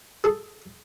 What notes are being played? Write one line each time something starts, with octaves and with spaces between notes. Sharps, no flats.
G#4 A4